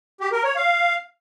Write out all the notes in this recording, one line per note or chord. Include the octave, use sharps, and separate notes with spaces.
G4
A#4
C#5
F5